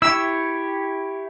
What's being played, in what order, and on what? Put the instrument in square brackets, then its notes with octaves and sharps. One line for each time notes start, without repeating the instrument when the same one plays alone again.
[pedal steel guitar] E4 G4 C#5 [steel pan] E6